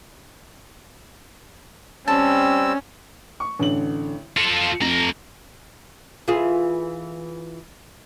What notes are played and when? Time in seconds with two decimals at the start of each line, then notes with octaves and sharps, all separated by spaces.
2.08 G3 C4 C#4 A5 E6
3.40 C#6
3.59 A1 D3 F#7
4.37 F4 A4 C#7 E7
4.81 F2 A3 A#5
6.28 E3 F4 G#4